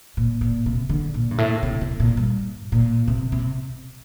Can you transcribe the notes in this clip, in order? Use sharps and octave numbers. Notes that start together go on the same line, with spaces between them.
A#2
A#2
C3
D3
A#2
G2
A2
C3
C3
A#2
G2
A#2
C3
C3